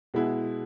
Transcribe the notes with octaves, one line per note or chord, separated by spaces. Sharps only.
B2 G#3 B3 E4 G#4